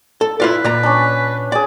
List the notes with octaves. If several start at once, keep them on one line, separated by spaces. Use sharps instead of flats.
A4
E4 F4 B4 D5
A#2 D5 A#5
C#4 D4
G#4 D5 D6